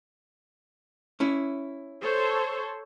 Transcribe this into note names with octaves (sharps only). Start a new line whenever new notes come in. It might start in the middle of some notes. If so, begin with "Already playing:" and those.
C#4 E4
A4 C5 C#5